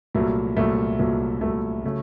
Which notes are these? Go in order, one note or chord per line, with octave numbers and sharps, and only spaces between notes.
C2 A#2 F#3 A3
C2 A#2 F#3 A3
C2 A#2 F#3 A3
C2 A#2 F#3 A3
C#3 F#3 A3 C#4